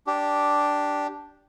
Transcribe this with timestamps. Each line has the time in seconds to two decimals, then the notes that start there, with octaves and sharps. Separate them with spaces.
0.07 D4 G4